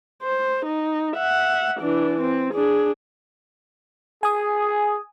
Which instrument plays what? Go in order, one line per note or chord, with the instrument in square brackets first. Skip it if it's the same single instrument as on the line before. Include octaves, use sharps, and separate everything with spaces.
[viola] C5
D#4
E5 F#5
E3 D4
C4
D4 G#4
[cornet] G#4 [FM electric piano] G#5 D#6